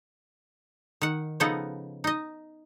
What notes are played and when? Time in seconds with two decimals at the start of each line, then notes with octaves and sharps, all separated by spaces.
1.02 D#3 F#5
1.40 C#3 F3 B3 D#4 A4 F#5
2.04 D#4 D#5